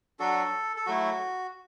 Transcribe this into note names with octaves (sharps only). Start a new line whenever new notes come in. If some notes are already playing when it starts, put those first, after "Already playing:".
F#3 D4 F#4 A4
A4
F#3 A3 E4 F#4